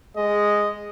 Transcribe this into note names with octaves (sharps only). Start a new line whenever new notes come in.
G#3 D#5